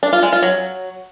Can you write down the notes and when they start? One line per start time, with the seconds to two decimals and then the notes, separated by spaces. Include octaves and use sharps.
0.03 D4
0.13 F4
0.23 G#3
0.33 F4
0.42 F#3